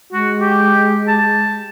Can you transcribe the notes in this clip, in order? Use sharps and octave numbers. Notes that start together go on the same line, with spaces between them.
G#3 F#4
G4
A5